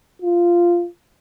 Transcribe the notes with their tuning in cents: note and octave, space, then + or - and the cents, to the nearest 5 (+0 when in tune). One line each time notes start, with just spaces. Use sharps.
F4 -10